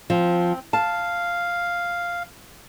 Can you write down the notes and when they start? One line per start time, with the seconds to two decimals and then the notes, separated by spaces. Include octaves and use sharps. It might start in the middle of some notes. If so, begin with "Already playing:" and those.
0.10 F3 C4
0.73 F5 A5